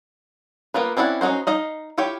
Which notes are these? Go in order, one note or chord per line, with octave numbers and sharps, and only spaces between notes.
A#3 B3 F4 B4
C4 C#4 E4 D5 F#5
C#4 D#4 E4 F#4 C5
D#4 D#5 F5
E4 F4 G4 C#5 G5